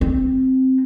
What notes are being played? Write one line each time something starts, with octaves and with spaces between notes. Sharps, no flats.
C4